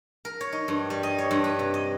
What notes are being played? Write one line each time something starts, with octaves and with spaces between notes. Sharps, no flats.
A#4
C#5
D#4
G2
G3
D#5
C#5
G2
B4
C3
D#5